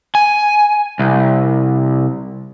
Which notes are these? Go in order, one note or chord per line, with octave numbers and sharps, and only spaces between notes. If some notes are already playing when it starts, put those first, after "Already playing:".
G#5
C2